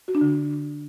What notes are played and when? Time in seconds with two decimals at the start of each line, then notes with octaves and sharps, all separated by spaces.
0.08 F#4
0.15 D4
0.21 D3